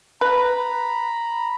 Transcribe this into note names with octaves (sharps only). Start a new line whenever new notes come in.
B4 A#5 B5